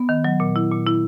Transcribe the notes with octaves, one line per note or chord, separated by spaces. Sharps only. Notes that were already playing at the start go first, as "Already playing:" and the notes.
Already playing: B3
D#3
F#3
A#2
E4
A#2
E4